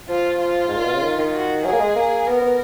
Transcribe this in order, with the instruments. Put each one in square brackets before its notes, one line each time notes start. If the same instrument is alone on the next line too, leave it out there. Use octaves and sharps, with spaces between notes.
[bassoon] F3 [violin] F4
[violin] F4
[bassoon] G#2
A#2
B2
C#3
D#3
D#3
[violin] F#4
[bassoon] F#3 [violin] G#4
[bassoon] A#3
G#3
A#3
[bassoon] B3 [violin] A#4
[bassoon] B3